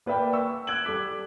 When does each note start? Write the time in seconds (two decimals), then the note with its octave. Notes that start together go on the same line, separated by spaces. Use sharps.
0.06 A#3 B4 D5 E5 G5
0.33 C#6 E6
0.67 E6 F#6 G#6 D7 F#7
0.85 G3 A4 D6 B6